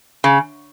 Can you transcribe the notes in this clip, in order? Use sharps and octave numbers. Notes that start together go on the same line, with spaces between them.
C#3